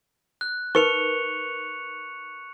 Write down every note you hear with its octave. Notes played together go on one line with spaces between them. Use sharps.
F#6
D#4 A#4 B4 C#6 C#7 F7